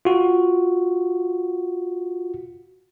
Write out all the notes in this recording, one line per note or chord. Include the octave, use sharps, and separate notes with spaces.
F4 F#4